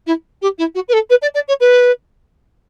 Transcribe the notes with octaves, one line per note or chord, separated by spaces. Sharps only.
E4
G4
E4
F#4
B4
A4
B4
D5
D5
C#5
B4